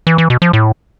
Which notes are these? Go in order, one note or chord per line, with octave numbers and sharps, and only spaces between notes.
E3
E3
B2
F3
A2